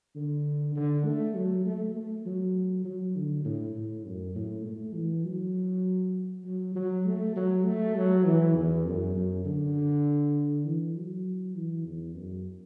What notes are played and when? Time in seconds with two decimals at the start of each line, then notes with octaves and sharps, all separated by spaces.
0.16 D3
0.76 D3
1.05 A3
1.35 F#3
1.65 A3
1.95 A3
2.25 F#3
2.85 F#3
3.16 D3
3.45 A2
3.75 A2
4.06 F#2
4.35 A2
4.65 A3
4.95 E3
5.25 F#3
6.45 F#3
6.75 F#3
7.05 A3
7.36 F#3
7.65 A3
7.96 F#3
8.25 E3
8.56 E2
8.85 F#2
9.15 F#2
9.45 D3
10.65 E3
10.95 F#3
11.55 E3
11.85 E2
12.15 F#2